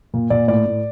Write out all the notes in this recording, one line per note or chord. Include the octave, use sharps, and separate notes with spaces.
A#2
A#2 D5
A2 D5
A2